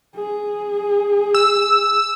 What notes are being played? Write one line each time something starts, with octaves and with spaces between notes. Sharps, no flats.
G#4
E6